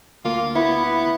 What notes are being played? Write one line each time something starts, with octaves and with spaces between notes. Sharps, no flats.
D2 A#3 F4
B3 E4